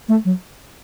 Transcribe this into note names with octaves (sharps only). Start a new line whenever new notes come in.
A3
F#3